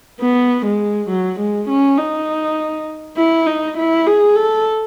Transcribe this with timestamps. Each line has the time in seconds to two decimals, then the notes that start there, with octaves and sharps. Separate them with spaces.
0.20 B3
0.65 G#3
1.09 F#3
1.39 G#3
1.69 C#4
1.98 D#4
3.17 E4
3.46 D#4
3.77 E4
4.06 G#4
4.36 A4